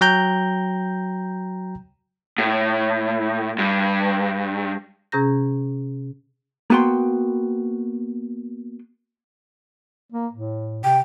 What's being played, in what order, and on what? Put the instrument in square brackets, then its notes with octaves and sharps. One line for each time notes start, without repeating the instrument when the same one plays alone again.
[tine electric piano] F#3 G5 A#5 G6
[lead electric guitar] A2
G2
[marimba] C3 C#4 G#4 A#5 G6 A#6
[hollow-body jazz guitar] A#3 B3 F#4 G5 C6
[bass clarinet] A#3
A2
[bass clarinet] C3 [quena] G5